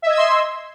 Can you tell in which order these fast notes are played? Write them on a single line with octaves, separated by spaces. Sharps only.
E5 D#5 G#6 E6 C6